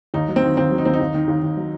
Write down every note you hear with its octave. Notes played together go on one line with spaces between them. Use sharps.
D#2 D#4
F#3
C4
D#3
D#2 C4
F#3
D#4
D#2 C4
D#4
D#2
D#3
D#2
D#2
F#3